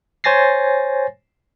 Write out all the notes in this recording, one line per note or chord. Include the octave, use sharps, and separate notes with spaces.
C5 C#5 G#5 A6 A#6 C7